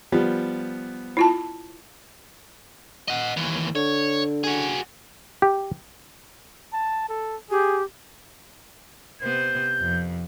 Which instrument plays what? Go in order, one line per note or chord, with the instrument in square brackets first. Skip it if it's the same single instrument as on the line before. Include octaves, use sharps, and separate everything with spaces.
[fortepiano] F3 G3 B3
[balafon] E4 F4 A5
[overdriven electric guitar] D#5 F#5
D#2 E3
[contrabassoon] D3 [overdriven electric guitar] C#5
[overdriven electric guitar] F#4 G#4
[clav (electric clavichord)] G4
[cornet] A5
A4
[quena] G4 [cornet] G#4
[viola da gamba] C3 B3 C5 [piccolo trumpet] G6
[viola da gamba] F2